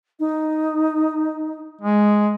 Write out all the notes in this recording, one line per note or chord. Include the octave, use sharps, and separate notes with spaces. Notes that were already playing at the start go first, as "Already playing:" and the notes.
D#4
G#3